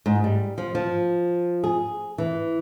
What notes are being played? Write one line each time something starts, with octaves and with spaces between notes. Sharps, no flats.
G#2
G3
F3
F3
G#4
E3